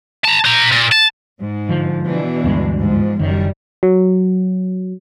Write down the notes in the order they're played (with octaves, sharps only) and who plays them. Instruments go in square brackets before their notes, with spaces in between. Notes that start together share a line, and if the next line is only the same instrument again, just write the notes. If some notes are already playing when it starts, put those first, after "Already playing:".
[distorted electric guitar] A5 A#5
C5 A#5
A#2
A5
[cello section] G#2
[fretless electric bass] D3 F3
[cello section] B2 E3 D4
[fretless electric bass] D2 G2 G#3
[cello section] G#2 F3
[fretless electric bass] F#1 D#3 [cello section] F#2 G3
[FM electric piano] F#3